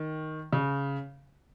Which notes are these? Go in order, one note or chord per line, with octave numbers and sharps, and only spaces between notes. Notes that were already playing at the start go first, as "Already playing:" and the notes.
Already playing: D#3
C#3